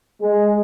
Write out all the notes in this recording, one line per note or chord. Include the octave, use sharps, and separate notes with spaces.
G#3